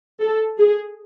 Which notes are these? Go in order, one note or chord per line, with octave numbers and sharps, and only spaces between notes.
A4
G#4